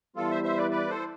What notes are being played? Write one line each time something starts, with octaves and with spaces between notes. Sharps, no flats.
E3 G3 B3 E4 F4 A4
C5 E5
C5 E5
B4 D5
B4 D5
A4 C5